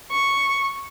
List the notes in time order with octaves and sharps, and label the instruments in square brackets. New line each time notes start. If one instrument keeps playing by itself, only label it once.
[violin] C#6